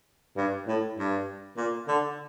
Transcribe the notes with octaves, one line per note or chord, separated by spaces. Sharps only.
G2
A2
G2
A#2
D3